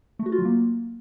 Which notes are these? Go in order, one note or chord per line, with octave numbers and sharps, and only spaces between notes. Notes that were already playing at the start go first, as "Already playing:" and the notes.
A3
F#4
F4
F#3
A#3